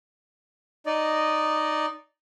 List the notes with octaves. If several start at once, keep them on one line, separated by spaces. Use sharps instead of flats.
D#4 D5 D#5